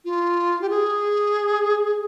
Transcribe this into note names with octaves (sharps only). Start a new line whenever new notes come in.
F4
G4
G#4